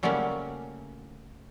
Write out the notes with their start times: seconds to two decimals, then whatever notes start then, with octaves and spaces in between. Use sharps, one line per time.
0.03 C#3 F#3 G3 A3 A#3 C#4